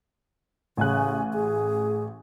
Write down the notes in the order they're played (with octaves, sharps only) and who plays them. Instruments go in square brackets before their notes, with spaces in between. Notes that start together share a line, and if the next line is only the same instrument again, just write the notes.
[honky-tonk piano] A1 G#5 F#6 [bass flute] C#3
[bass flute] G#4